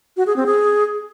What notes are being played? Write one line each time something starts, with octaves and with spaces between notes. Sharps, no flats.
F#4
G#4
C4
G#4